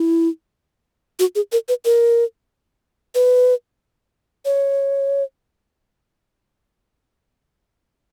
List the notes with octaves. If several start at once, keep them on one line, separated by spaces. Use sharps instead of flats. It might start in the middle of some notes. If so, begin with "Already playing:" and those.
Already playing: E4
F#4
G#4
A#4
B4
A#4
B4
C#5